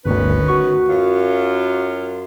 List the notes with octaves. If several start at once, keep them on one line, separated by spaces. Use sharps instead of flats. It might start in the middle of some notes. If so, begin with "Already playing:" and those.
G1 D2 D#3 C#4 B4
F#4 C#6
F#2 F4